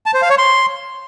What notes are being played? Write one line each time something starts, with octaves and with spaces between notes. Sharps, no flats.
A5
C5
F5
C#5
C6